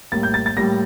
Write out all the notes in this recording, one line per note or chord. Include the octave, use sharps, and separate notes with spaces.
A2 G3 A#3 A6
G6
A6
A6
A2 G3 A#3 A#6